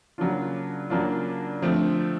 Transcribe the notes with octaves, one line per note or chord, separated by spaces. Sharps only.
C#3 F#3 A#3 D4 F4
C#3 F#3 A#3 D4 F4
D3 F3 A3 C4